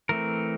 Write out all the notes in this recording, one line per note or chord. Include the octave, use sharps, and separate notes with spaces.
E3 A3 C4 A#4